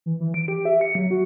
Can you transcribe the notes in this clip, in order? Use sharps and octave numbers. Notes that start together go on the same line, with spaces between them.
E3
E3
D7
G4
E5
C#7
F#3
F#4